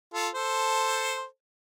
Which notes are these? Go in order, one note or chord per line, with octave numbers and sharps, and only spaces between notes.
F4 A4
A4 C5